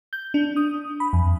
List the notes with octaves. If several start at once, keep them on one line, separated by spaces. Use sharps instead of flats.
G6
D4
D#6
B5
F2